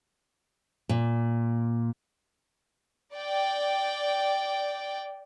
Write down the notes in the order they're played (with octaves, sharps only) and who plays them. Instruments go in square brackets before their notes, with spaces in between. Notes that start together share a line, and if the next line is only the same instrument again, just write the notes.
[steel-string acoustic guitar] A#2
[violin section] D5 G5